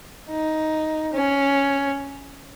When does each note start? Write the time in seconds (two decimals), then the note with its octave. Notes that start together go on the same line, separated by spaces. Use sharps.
0.30 D#4
1.13 C#4